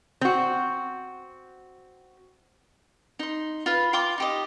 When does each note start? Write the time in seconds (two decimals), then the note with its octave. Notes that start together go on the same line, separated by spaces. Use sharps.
0.21 C4 F#4
3.19 D#4 C6
3.66 F4 B4
3.93 F4 G5 C6 D6
4.18 D#4 G4 D#5